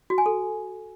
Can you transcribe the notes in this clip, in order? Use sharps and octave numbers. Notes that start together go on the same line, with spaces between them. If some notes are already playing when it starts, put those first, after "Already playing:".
F#4
G#5
A4